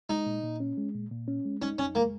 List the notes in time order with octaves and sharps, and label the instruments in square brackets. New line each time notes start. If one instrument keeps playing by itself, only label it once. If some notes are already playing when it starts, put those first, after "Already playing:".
[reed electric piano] G#3 [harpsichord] D#4
[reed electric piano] A#2
A#2
C#4
G#3
A#2
A#2
C#4
G#3
[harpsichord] C#4 [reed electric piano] D#4
[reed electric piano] F2 [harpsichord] C#4
[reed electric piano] G#3 [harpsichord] A#3